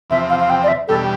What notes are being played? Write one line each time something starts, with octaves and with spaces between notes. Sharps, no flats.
E2 C3 F3 C4 E5
F5
F5
G5
D5
E5
E2 B2 G3 D4 G4 A4